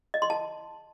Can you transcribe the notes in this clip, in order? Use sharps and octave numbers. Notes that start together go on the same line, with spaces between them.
D#5
C6
A5